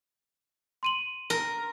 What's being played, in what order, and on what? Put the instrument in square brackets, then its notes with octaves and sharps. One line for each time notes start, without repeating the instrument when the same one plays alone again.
[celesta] C6 D#7 F#7
[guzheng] A#4